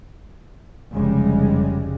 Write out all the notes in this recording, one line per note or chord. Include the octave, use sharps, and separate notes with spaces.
F1 C#3 G3 G#3